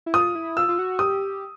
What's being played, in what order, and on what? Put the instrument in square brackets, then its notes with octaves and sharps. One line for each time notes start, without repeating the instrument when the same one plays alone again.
[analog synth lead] E4
[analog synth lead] F4 [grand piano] D#6
[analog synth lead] E4
[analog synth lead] F4 [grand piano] E6
[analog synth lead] F4
F#4
[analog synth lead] G4 [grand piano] D#6